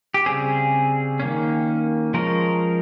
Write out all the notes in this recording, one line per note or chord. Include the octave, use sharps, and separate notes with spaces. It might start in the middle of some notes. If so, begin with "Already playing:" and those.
G4
C#3 G3 C4 G#4
D#3 A#3 C#4
F3 G#3 C#4 A#4